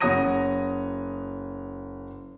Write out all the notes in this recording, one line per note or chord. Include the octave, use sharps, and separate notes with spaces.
F#1 C#5 F#5 D#6 A#6 D#7